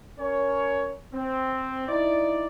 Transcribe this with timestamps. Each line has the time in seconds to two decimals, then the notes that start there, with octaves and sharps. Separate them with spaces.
0.19 C#4 A#4 C#5
1.13 C4
1.88 D#4 E4 D5